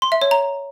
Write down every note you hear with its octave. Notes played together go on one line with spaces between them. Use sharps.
C6
E5
C#5
A#5